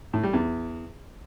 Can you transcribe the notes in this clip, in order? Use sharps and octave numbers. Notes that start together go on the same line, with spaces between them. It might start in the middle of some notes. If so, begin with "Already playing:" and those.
A2
G3
E2